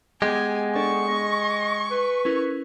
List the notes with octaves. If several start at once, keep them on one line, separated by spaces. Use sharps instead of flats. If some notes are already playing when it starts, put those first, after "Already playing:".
G#3 B3 G4 G#5
D4 A4 D5 C#6
D#5
G#5
B4
C#4 E4 A#4